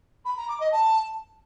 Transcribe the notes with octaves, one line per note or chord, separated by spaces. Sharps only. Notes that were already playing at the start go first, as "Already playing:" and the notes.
B5
A#5
D6
D#5
A5